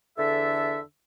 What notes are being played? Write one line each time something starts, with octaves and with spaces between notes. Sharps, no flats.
E2 D3 A4 E5